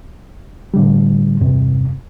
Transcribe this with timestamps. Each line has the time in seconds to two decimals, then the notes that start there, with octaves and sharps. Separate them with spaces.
0.74 A2 D3 G3
1.41 E2 G2 C3